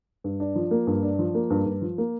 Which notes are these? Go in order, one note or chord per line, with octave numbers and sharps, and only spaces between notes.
G2
D4
F3
A#3
G2
D4
F3
A#3
G2
G2
F3
A#3